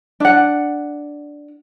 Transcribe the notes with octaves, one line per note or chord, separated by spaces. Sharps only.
D4 F#5